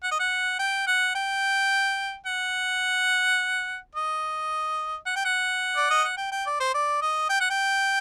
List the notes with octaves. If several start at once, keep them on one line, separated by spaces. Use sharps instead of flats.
F#5
D#5
F#5
G5
F#5
G5
F#5
D#5
F#5
G5
F#5
D5
D#5
F#5
G5
G5
D5
C5
D5
D#5
G5
F#5
G5